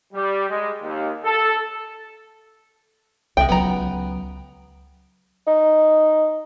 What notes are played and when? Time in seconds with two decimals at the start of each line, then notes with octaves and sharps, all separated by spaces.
0.13 G3
0.49 G#3
0.82 D#2
1.25 A4
3.37 C2 G#3 E5 G5
3.49 C#2 F#3 B3 A#5
5.47 D#4